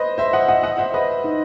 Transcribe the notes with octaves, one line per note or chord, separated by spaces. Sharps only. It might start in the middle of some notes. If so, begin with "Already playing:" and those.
Already playing: B4 C5 D#5
C5 E5
D#5 F#5
D#5 F#5
D#5 F#5
C5 E5
B4 D#5
D#4